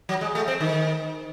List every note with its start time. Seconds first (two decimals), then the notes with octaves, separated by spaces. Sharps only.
0.09 F#3
0.21 G#3
0.35 A3
0.48 C4
0.61 D#3